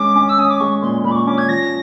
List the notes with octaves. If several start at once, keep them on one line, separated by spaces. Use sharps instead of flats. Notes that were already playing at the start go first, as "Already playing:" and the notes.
Already playing: G#3 C#4 D6
C#4
E6
C#4 D#6
D6
G#3 C#6
A#2 C6
A#2 B5
D6
C#6
C#4 D6
G#6
F3 A#6